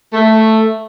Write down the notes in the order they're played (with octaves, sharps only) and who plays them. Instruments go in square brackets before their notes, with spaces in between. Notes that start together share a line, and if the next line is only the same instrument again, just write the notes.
[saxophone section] A3